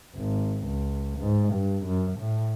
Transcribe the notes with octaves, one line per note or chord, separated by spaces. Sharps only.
G#1
C#2
G#2
G2
F#2
A2